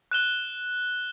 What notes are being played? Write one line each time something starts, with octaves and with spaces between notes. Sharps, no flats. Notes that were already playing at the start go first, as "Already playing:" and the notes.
F#6 E7 G7